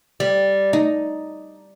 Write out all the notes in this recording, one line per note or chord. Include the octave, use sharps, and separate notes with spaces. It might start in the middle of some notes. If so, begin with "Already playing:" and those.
G3
D#4